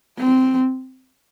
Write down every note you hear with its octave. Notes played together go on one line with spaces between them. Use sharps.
C4